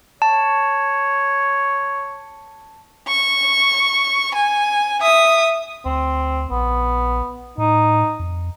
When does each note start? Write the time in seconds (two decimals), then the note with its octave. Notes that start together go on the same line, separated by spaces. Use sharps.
0.22 C#5 A5
3.08 C#6
4.35 G#5
5.02 E5 D#6
5.85 D2 C4
6.51 A#1 B3
7.58 A2 D#4
8.20 F2